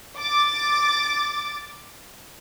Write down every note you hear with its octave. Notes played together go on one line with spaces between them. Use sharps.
D6 A6